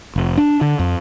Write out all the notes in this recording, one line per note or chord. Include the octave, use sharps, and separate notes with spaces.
F1
D4
D3
F2